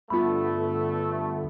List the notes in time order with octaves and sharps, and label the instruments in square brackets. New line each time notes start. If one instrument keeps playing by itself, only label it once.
[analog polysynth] G2 D3 B3 [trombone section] A3 [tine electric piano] F4 B5